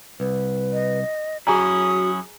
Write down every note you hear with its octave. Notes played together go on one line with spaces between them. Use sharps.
C2 B4
D#5
F#3 C#4 E4 F#4 G#4 G#5 A#5 D#6